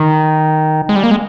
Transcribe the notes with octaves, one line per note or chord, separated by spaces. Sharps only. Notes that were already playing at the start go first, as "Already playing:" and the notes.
Already playing: D#3
G#3
G3
A#3
G#3